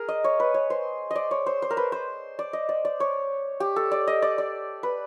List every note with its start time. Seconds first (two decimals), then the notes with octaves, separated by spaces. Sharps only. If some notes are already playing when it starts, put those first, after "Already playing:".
Already playing: G#4 A#4
0.08 D#5
0.24 C#5
0.40 B4
0.54 C#5
0.70 C5
1.11 D5 D#5
1.31 C#5
1.46 C5
1.62 C5
1.70 A#4
1.77 B4
1.92 C5
2.39 D5
2.53 D#5
2.69 D5
2.85 D5
3.00 C#5
3.60 G4
3.76 A4
3.91 D5
4.07 D#5
4.22 D5
4.38 D5
4.83 B4